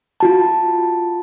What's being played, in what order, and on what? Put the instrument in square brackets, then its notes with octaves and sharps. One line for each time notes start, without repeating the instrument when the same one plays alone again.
[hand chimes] F4 F#4 A5